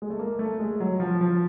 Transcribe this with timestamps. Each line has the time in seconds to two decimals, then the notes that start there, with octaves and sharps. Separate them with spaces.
0.02 G#3
0.10 A3
0.19 A#3
0.39 A3
0.59 G#3
0.80 F#3
1.00 F3
1.21 F3